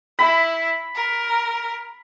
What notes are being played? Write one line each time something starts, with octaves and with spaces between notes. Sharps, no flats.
E4 B5
A#4